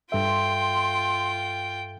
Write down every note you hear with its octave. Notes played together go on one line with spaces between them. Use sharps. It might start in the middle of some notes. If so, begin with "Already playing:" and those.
G2 F4 A4 E5 G5 C6